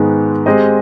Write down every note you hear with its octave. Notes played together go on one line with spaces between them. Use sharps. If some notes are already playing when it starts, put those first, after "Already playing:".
Already playing: G#2 D#3 G#3 B3
G#3 C4 G4 C5 D#5